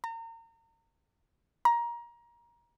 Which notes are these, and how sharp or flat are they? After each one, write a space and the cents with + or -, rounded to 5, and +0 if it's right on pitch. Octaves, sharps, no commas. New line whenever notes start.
A#5 -35
A#5 +20